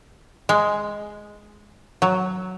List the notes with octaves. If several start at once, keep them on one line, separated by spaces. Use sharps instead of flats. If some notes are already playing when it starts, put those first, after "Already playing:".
G#3
F#3